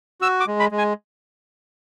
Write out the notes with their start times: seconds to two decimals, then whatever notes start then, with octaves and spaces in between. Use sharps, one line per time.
0.21 F#4 E6
0.40 D6
0.47 G#3
0.60 B5
0.71 G#3
0.78 G#5